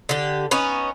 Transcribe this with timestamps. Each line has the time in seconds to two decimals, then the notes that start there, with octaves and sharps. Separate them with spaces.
0.09 D3 G4
0.51 B3 C#4 D#4